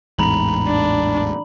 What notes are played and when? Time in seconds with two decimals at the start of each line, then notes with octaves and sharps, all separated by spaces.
0.19 A1 E2 G#2 A#5 B5 F#7
0.67 D4